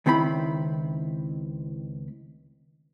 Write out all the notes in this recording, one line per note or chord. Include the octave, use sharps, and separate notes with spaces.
C#2 D#3 C4 E4 B5